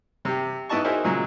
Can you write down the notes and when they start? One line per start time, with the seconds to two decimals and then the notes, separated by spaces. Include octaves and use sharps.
0.25 C3 G4
0.69 G#2 B3 E4 D#5 A5 C#6
0.84 D#4 E4 F#4 G#4 A#4 C5
1.04 A#2 C#3 F#3 G#3